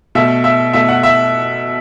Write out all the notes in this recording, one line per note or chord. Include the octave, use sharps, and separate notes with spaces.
B2 A3 E5
E5
B2 A3 E5
F#5
E5